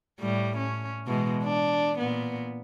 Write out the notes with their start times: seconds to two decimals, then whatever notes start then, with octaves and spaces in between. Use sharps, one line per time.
0.20 A2 G3
0.58 C#4
1.07 B2 E3 G#3
1.43 D4
1.98 A#2 B3